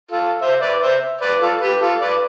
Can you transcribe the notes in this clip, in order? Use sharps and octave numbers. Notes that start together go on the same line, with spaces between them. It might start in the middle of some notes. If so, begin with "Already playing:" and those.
F4 A4
C5 E5
B4 D5
C5 E5
B4 D5
F4 A4
G4 B4
F4 A4
B4 D5